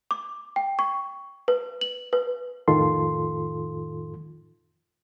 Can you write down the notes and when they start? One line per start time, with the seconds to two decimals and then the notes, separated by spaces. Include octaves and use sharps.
0.11 D6
0.56 G5
0.79 C#6
1.48 B4
1.81 F#7
2.13 B4
2.68 F2 A2 D#3 F4 A4 C6